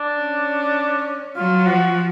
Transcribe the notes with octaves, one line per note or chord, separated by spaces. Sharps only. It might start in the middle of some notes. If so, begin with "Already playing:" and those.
Already playing: D4
C#4
F#3 F4
F3 F#4